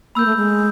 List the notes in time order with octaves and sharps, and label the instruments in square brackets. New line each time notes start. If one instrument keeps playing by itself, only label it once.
[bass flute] A#3 [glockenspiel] B5 E6 G6
[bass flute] A3
G#3